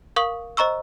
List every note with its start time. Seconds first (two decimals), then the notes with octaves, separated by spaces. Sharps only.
0.16 A#4 F5 C#6 D#6 F#7
0.57 C5 D#5 A#5 C#6 E6